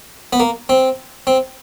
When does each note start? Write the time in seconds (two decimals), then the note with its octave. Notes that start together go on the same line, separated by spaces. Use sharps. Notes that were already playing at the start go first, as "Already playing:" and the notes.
0.33 B3
0.40 A#3
0.69 C4
1.27 C4